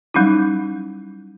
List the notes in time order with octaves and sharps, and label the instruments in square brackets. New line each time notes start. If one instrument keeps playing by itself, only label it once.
[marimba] F#3 G3 C#4 D#4 E4